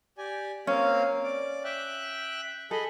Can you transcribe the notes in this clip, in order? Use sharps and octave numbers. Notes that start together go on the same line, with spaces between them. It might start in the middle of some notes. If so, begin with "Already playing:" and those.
G4 D5 G#5
A#3 C4 C#4 F5
D5 D6
E5 G5 F#6
G#4 A4 D#5 B5